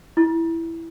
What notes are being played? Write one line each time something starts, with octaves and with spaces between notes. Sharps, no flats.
E4